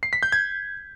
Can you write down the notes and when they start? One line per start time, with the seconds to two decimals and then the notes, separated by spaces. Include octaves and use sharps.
0.03 C7
0.13 B6
0.23 G6
0.32 G#6